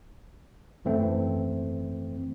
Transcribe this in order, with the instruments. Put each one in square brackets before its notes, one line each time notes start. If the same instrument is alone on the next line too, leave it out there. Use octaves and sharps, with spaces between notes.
[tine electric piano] F#2 E3 A3 C4